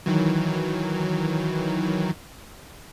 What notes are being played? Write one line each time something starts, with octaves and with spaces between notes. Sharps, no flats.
D#3 E3 F#3